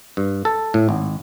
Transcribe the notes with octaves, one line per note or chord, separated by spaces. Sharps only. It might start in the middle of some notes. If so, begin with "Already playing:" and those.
G2
A4
A2
G#1